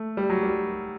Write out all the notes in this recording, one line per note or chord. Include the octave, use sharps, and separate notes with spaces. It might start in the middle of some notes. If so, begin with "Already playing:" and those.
Already playing: A3
G3
F#3
G3